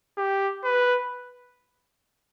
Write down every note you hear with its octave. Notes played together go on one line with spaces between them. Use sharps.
G4
B4